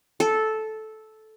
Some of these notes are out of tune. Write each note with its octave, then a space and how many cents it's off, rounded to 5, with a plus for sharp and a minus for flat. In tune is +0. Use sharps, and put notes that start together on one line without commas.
A4 -10